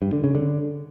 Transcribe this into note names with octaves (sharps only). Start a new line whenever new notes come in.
G2
D3
C#3
D3